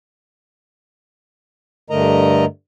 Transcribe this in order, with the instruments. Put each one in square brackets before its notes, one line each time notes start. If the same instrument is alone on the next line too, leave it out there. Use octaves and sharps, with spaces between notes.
[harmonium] G2 D3 A3 A#4 D#5 A#5